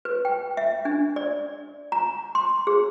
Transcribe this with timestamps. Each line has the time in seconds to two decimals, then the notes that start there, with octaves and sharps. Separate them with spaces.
0.05 B4
0.25 G5
0.57 E5
0.85 D4
1.16 D5
1.92 A#5
2.35 C6
2.67 G#4